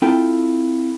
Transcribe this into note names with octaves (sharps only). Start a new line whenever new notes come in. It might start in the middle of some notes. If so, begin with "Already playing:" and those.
C4 E4 F4 A4 G5